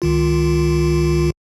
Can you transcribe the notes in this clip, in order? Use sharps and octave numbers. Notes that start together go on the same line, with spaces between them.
C#2 D#3 F4